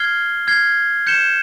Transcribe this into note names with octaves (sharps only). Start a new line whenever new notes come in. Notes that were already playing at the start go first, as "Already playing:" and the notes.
Already playing: F6 G#6 C7 G7
F6 G#6 C7 G7
G6 C#7 E7 G7